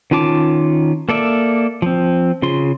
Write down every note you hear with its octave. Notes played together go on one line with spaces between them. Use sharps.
D#3 C#4 F4 A5 D6
A#3 A4 D5 E5
F3 C4
C#3 F4 C6